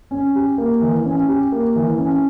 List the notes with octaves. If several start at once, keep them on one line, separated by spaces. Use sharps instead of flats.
C#4
G4
A#3
E3
C#4
G4
A#3
E3
C#4